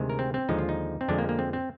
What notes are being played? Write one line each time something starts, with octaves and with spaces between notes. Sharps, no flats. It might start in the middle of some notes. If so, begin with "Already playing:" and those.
Already playing: D2 C3 D#3 G#3
A#4
C4
C4
D#2 D3 F3 G#3 D#4
F4
D#4
C4
F2 D3 F3 G#3 D4
A#3
A#3
C4
C4